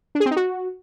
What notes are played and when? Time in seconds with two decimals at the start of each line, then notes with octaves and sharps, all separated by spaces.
0.15 D4
0.20 G#4
0.26 C4
0.31 D#4
0.36 F#4